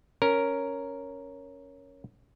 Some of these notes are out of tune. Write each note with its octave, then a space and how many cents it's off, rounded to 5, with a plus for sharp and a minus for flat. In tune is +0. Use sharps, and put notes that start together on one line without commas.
C#4 +0 A#4 +0